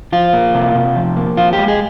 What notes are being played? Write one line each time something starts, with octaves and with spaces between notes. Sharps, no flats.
F3 F4
A#3
C3
C3
F3
A#3
F3 F4
G4
G#3
G#4